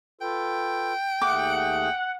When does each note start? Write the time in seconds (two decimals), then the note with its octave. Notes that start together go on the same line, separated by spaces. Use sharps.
0.21 F4 A4 B4 G5
1.22 D#2 A3 G#4 F#5 D6